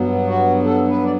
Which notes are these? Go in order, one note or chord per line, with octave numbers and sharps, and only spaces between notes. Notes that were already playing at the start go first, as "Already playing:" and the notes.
Already playing: G2 F#3 B3
F#4
A4
B4
D5